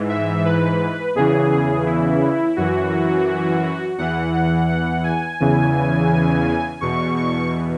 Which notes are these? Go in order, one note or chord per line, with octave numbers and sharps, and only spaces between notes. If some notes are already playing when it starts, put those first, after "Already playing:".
Already playing: G#2 E3
E5
B4
E2 C#3 E3 G#4
G#4
E4
F#2 E3 F#4
E2 E3 F#5
F#5
F#5
G#5
E2 C#3 E3
E2 B2 C#6
C#6